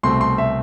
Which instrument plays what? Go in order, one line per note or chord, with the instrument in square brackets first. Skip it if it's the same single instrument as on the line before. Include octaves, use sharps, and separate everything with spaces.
[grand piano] C2 B2 A3 C4 C6
C6
E5